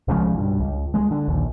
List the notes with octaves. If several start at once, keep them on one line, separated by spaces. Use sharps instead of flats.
C2 C#3 F3 G#3
B1 G2
C#2
G#3
D3
A#1 D#2